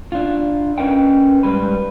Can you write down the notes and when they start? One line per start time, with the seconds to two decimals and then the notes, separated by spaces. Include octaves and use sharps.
0.12 D4 F4
0.78 C#4 A#4 B4 D#5 G5
1.43 G#2 C3 G3 B4